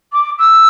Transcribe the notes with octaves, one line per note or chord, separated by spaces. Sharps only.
D6
E6